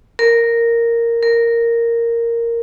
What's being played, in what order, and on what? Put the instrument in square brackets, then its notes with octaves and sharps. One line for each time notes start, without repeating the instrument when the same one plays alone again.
[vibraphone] A#4
A#4